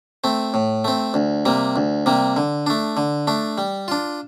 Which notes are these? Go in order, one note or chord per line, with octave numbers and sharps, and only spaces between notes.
A3 C4
A2
A3 C4
D2
C3 G3 A#3
D2
C3 G3 A#3
D3
A3 D4
D3
A3 D4
G3
D4 F4